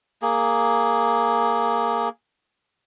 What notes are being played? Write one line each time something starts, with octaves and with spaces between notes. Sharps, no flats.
A#3 G#4